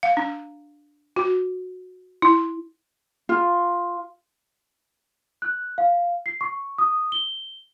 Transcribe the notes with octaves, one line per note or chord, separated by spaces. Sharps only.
F5
D4
F#4
E4
F4
F#6
F5
C7
C#6
D#6
G7